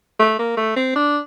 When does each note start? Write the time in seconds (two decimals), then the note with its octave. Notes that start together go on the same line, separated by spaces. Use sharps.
0.19 A3
0.39 A#3
0.57 A3
0.76 C4
0.96 D4